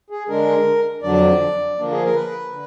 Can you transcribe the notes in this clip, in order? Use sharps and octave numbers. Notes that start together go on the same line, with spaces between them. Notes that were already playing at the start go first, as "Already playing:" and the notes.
G#4
D3 G#3 D4 A#4
F2 D3 F#3 D4 D5
D3 F3 A#3 D4
G#4
A#4
B4
D3